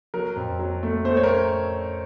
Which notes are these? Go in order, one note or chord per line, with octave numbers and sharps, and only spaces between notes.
F#3 A#4
F2
F#3
A3
A3 C5
C#5
A#4